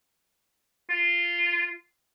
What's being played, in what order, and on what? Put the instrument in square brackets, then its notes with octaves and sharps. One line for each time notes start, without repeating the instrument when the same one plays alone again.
[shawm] F4